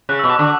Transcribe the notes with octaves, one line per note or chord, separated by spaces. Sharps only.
C#3 F#6
B2 E6
D6
D3 C#6